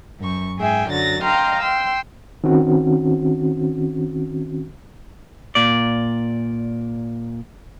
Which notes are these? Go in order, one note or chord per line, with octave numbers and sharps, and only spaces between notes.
F#2 C#6
G#2 G#4 E5 G5 G#5
F#2 D3 F#3 A6 A#6
D#5 F5 G5 A#5 C6
G5 C6 E6
D#3 C4 C#4 F#4
A#2 D5